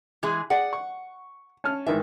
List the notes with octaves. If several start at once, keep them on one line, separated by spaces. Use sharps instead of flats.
E3 G#3 G#4
G#4 D5 F#5
C#6
C#4 A5 F6
G#2 D#3 E3 E5